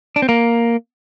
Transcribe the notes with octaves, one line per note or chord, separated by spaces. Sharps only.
D4
C4
A#3